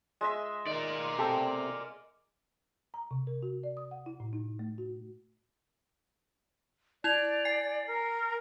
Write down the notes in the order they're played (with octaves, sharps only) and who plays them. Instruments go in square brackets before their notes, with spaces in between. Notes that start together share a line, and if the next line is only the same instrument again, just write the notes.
[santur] G#3 D#5 E5
[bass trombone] D#3 [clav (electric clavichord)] D#4 [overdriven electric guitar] A#4 D5
[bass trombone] C3 [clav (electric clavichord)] G4 A4
[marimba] A#5
C3
A#4
F#4
D5
D#6
F#5
E4
A2
D#4
A3
F#4
[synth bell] E4 G#6 F7 [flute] D5
[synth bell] G#5 C7
[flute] A#4